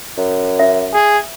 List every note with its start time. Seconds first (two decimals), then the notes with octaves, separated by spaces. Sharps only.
0.17 F#2
0.59 E5
0.93 G#4